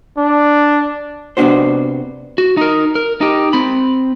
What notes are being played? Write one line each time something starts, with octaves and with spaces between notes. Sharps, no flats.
D4
C3 B3 C4 D4 F#4 C5
F#4
D#4 A#4
A#4
D#4 G4
C4 B5